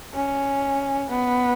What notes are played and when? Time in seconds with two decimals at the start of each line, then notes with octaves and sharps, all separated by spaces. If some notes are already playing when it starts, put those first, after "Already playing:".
0.14 C#4
1.11 B3